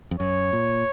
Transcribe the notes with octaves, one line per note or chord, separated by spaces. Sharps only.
F2
F#2 C#5
A#2